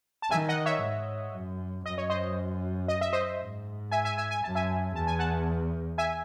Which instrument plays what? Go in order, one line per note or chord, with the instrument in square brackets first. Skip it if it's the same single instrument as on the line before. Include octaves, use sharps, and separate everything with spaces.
[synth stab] A5
[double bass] D#3 [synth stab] E5 G#5
[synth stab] D#5 F#5
C#5 E5
[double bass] G#2
F#2
[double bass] F#2 [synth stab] D#5
[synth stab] C#5
C5 D#5
D#5
E5
C5 D#5
[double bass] G#2
[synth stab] E5 G#5
E5 G#5
E5 G#5
G#5
[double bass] F#2 [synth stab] A5
[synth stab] E5 G#5
[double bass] E2 [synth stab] A5
[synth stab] G#5
F#5 A5
E5 G#5